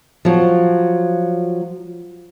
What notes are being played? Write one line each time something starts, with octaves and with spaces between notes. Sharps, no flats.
F3 F#3